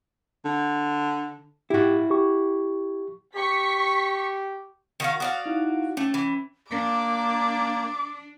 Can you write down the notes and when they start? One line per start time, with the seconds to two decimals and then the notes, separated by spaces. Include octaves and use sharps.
0.45 D3
1.70 G#2 E4 F#4 G4
2.10 G4 C#6
3.36 G4 C#6 B6
5.00 D#3 F#4 F5
5.20 F#4 D5 F5 D#6
5.46 D#4 E4
5.97 A3 C#4
6.14 E3
6.71 A#3 D4 D6